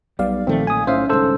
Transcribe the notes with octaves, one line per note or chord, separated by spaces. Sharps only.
B1 G3 B3 D5 F5
A#2 D#3 F3 A3 C4
G#5 D#6
A2 C#4 C5 E5 F5
C2 G#2 D3 A4 C5 E6